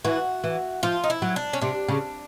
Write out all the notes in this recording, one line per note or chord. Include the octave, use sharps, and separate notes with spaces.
E3 F#4
E3
F3 F4
D#4
E4
F#3
D4
C#4
C3 D4
C#3